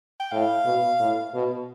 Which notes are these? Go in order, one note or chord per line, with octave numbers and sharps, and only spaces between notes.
G5
A2 F5
B2
A2
B2